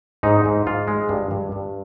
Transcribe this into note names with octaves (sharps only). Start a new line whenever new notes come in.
G#2 D#4
G#2
G#2 F4
G#3
G2
G2
G2